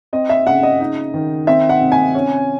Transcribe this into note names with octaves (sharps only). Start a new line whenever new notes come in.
C4 D#5
E5
C#3 F#5
D#5
D#4
D#3
C4 E5
F#5
C3
G#5
C#4